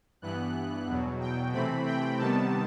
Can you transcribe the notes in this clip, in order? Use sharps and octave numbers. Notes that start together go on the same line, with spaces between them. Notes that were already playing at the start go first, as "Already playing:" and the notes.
G2 E3 B3 F#6
E2 B2 F#3
G5
C3 E3 A3 C4 B5
G5
C3 D#3 G3 B3 A5